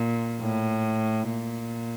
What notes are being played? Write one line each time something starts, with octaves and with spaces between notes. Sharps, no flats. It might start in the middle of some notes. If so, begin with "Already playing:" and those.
Already playing: A#2
A2
A#2